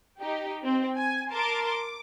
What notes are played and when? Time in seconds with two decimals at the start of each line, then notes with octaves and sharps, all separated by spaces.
0.20 D#4 G4
0.63 C4
0.96 G#5
1.32 A#4 A5 C6 D6
1.67 D6